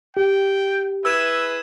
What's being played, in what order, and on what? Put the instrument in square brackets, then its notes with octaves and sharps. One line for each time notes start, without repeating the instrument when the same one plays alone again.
[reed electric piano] G4 [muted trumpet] G5
[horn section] E4 G#4 B4 [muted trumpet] E5 [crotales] E6 G#6 E7